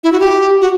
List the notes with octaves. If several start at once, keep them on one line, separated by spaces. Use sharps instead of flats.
E4
F#4
G4
F#4